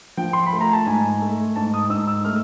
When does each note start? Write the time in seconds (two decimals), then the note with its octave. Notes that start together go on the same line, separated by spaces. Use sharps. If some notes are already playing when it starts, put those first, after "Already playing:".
0.17 F3 G5
0.33 C6
0.46 B5
0.53 A3
0.61 A#5
0.73 A5
0.86 G#2 G#5
1.22 A3
1.56 G#2 A5
1.74 D#6
1.90 G#2 E6
2.07 E6
2.25 A3 F6